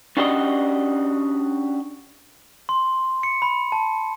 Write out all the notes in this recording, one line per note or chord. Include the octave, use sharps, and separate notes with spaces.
C#4 D4 F#4 G4 D5 D#5
C6
C#7
B5
A5